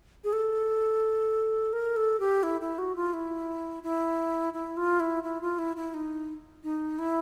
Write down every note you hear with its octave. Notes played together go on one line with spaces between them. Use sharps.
G#4
A4
A#4
A4
G4
E4
E4
F#4
F4
E4
E4
E4
F4
E4
E4
F4
E4
E4
D#4
D#4
E4